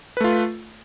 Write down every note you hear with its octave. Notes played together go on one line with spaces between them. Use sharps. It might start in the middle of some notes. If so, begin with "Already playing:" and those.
A3 F4 B4